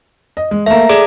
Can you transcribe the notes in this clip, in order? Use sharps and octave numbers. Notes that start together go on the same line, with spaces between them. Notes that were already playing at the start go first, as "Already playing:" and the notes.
D#5
G#3
A3 A#3 E5 A#5
G#4 A4 D5 E7